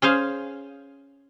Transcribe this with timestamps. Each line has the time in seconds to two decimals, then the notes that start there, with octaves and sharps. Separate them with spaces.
0.02 C#4 G#4 C5 F5